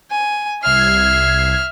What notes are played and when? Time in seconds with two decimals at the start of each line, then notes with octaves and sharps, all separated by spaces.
0.11 G#5
0.63 C2 E5 F6 G#6 C7